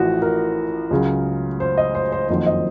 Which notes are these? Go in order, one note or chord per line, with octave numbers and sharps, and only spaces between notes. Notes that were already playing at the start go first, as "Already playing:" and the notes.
Already playing: A1 A2 F3 F#4
A#4
C#2 C#3 F#3
C5
D#5
C5
C5
F#1 F2 D#3 F#3 C5
D#5